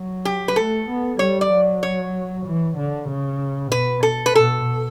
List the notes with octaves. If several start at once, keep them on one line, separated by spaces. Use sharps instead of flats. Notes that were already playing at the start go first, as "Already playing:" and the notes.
Already playing: F#3
G4
B4
A3 A4
B3
G3 C#5
D5
F#3
C#5
E3
D3
C#3
B2 B4
A4
B4
B2 A4